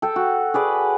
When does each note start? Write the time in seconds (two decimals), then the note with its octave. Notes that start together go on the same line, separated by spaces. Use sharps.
0.02 A4 G5
0.16 F#4
0.54 G#4 B4 D5